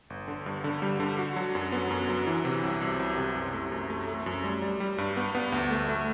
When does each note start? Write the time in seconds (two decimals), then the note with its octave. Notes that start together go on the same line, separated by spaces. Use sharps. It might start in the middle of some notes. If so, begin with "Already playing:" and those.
0.10 G1
0.28 D3
0.46 G2
0.64 D3
0.82 G3
1.00 D3
1.18 F#4
1.36 F#3
1.55 F#2
1.72 B3
1.91 F#2
2.09 F#3
2.27 E3
2.45 C3
2.63 C2
2.81 C2
2.99 C2
3.18 C3
3.35 F#2
3.53 A3
3.72 F#2
3.90 A3
4.08 A3
4.26 F#2
4.44 G3
4.62 G3
4.80 G3
4.98 G2
5.17 B3
5.35 B3
5.52 D2
5.71 A3
5.89 A3